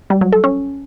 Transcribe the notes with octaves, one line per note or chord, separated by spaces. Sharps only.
G3
F#3
A4
C#4